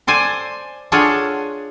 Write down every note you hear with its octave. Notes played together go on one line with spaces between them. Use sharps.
A4 C5 D5 G#5
D4 F4 G#4 A4 C#5 F#5